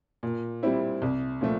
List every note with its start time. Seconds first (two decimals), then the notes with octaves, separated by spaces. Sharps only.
0.23 A#2
0.63 G3 C4 E4
1.02 C2
1.41 A#2 F3 A3